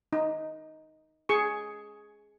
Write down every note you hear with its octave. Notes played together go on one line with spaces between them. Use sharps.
D#4
G#4 C#6